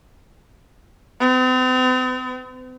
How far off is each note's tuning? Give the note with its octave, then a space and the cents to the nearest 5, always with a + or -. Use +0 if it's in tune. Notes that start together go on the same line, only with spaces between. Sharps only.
C4 -45